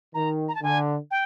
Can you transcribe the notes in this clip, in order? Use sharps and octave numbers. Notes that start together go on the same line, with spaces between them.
D#3 A#5
A#5
A5
D3 G#5
G5